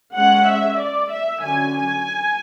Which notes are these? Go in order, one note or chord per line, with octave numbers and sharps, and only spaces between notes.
G#3 C#4 F#5
E5
D5
E5
D3 F#3 C#4 G#5
G#5